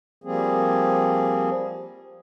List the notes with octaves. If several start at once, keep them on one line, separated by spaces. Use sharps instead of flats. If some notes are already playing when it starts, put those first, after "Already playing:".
F3 G3 A#3 C4 G#4